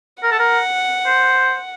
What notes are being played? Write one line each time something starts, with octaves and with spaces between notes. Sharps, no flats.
A#4 F#5
A4
A#4
C5